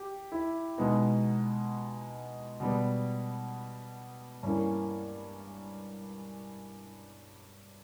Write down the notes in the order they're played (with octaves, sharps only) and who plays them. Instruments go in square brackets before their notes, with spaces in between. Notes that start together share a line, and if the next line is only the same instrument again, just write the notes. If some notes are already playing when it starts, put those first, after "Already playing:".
Already playing: [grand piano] G4
E4
B2 G#3 B3 D#4
B2 G3 B3
G2 E3 A#3 C#4